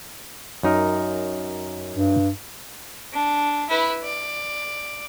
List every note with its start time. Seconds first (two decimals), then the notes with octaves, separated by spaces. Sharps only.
0.63 F#2 D#4 A#4
1.94 G2
3.13 D4
3.69 E4 B4
4.03 D5